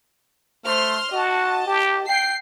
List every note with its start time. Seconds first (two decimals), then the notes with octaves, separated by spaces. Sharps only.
0.64 A3 C5 C6 F6
1.12 F#4 D#5 A5
1.67 G4
2.08 G5 C7